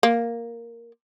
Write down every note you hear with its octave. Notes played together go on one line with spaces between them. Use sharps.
A#3